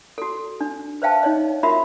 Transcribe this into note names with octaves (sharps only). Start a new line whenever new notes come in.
F#4 A4
D4
B4 C5 E5 F5 G5 A5
D#4 C#5 D#5
F4 F#4 A#4 E5 B5